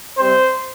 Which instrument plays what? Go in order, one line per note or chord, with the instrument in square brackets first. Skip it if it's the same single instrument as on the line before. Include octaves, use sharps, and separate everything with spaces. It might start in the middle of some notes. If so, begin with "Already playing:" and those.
[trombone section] C3 G3 C4 C5